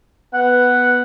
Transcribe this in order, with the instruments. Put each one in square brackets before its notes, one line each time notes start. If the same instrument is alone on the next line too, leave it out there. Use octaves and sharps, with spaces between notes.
[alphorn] B3 [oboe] F#5